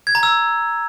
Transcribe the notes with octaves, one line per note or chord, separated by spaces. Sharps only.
G#6
A#5
E6